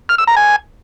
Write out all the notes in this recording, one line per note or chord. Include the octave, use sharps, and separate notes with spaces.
F6
E6
A#5
G#5